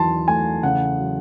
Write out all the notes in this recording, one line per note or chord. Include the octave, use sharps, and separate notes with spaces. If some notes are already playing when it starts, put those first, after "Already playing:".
Already playing: E2 D#3 F#3 A5 C6
A3 G#5
C#3 F#5
F#3